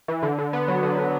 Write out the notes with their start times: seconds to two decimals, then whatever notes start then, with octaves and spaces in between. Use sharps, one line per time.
0.08 E3
0.23 D3
0.38 D3
0.53 B3
0.68 F#3
0.83 D3
0.98 D3